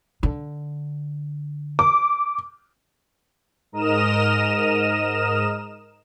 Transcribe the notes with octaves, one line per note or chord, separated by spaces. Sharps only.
D3
D6
G#2 A#4 D#5 D#6 F6 E7